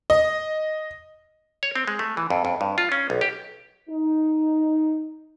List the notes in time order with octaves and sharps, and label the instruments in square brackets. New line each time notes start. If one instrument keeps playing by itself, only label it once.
[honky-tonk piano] D#5
[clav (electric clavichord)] C#5
C4
G#3
A3
E3
F2
F2
G2
F4
C#4
B1
G4
[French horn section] D#4